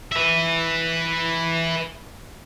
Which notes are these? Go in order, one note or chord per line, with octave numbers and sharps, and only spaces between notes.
B4 E5